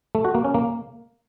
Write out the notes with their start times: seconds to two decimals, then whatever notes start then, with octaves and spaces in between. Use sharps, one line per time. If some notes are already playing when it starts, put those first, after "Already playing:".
0.15 A3
0.25 F#4
0.35 A#3
0.45 C#4
0.54 A#3